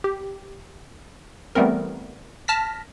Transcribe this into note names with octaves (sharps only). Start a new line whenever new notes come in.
G4
E3 G3 A3 B3 C4 A#4
A5 F6 A#6 B6